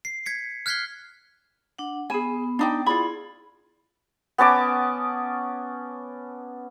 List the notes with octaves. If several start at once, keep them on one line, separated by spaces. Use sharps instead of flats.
C7
G#6 B6 C#7
F6 F#6 G#6 B6 C7 G7
D4 F#5
B3 G#4 G#5 B5
D4 D#4 G5
E4 F4 G#4 D5 B5
B3 C#4 A5 D6